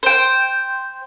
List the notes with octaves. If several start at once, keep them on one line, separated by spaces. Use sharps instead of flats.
C5 G5